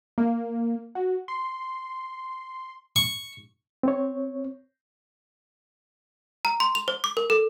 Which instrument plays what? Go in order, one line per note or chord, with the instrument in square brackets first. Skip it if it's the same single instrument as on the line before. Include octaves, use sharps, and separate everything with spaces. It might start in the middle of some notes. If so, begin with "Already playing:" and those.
[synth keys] A#3
F#4
C6
[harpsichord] C#6
[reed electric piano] C4 C#5
[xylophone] A#5
C6
F7
C5
D6
A#4
A4